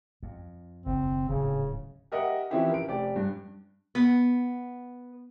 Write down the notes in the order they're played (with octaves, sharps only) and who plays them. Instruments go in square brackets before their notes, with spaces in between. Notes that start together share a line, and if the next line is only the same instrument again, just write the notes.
[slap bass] F2
[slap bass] F#1 D#2 [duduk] C4
[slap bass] D1 G#2 [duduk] C#3
[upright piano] G4 A#4 D#5 E5 F#5
E3 F3 C4 C#4 E4 G4
A#4 D7
F1 G4 D5
G2
[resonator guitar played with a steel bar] B3